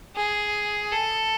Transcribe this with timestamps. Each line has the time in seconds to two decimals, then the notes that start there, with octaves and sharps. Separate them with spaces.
0.16 G#4
0.92 A4